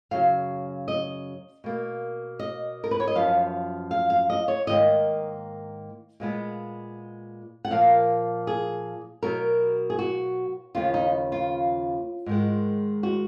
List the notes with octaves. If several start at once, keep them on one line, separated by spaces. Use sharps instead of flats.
F#2 C#3 F#3 F5
D#5
B2 A#3
D#5
A#4
B4
C#5
D#5
F#2 F3 B3 F5
F5
F5
D#5
C#5
G#2 D#3 A#3 D#5
A#2 G#3 B3
F#5
A#2 F3 A#3 F5
G#4
B2 F#3 B3 A#4
G#4
F#4
D#2 C#3 F3 B3 F4
D#4
F4
G#2 D#3 G#3
F#4